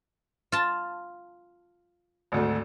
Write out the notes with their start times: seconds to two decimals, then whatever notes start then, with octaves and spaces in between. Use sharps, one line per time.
0.52 F4 A5
2.32 G#1 D2 A3